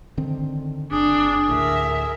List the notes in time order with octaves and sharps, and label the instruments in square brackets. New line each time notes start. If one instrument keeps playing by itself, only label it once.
[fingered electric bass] D3 D#3 C4
[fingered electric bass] F#1 [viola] D4 [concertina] G#4
[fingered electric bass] D2 A2 [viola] A#4 E5